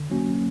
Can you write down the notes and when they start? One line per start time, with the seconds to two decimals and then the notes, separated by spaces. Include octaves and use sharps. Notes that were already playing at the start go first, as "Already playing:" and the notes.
Already playing: D3
0.10 F#3 A#3 C#4 F#4